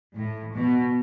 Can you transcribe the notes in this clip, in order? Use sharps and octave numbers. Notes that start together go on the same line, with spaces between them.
A2
B2